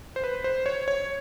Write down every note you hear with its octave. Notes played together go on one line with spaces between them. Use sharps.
C5
B4
C5
C#5
C#5